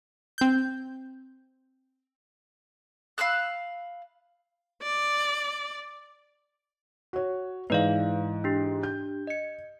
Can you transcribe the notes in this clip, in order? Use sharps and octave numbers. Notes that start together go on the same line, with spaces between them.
C4 G6
F5 B5 E6 F#6
D5
F#4 C#5
G#2 E3 B4 D5 F5
D4 G4
G6
D#5 C#7